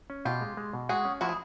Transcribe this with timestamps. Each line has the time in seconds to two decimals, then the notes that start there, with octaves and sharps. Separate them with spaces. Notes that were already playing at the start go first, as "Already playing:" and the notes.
0.10 C#4
0.25 B2 F4 G4
0.41 G#3
0.57 G#3
0.73 B2
0.89 G#3 F#4 G#4
1.05 C#4
1.21 F3 E4 F#4
1.29 G#4